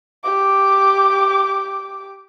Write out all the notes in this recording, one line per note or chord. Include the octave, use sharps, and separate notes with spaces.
G4 D6